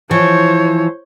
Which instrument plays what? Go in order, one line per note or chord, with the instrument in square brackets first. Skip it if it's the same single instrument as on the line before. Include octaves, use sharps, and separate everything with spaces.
[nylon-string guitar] E3 F3 [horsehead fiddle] C5 C#5